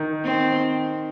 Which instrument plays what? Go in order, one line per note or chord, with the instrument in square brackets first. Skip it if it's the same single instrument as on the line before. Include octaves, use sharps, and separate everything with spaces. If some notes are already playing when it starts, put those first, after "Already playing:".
Already playing: [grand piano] D#3
[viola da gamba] C4